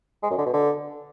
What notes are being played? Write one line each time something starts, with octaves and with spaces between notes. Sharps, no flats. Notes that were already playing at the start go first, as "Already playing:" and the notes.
G#3
F#2
D3
B2
D3